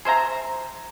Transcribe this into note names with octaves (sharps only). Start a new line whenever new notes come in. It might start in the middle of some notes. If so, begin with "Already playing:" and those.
G#4 C5 E5 A#5